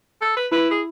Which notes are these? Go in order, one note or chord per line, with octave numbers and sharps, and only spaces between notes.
A4
B4
E4 B4
G#4